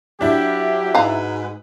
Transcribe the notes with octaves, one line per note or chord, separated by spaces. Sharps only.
F#3 D4 E4 G4
G#2 F#4 B4 F5 A#5